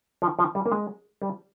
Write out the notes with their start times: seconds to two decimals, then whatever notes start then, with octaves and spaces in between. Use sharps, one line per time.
0.22 F3
0.39 F3
0.55 G3
0.66 A#3
0.72 G#3
1.22 G3